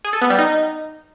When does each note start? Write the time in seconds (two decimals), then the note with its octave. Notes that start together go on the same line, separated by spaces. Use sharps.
0.05 G#4
0.13 A4
0.22 B3
0.30 G3
0.39 D#4